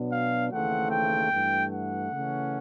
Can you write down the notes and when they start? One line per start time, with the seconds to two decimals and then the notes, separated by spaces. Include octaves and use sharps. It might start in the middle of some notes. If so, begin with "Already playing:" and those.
Already playing: B2 F#3 B3 D4
0.11 F5
0.51 D#2 C#3 E3 A3 C4 F#5
0.91 G5
1.31 G2 E3 A3
1.72 F#5
2.12 C#3 E3 A3 C#4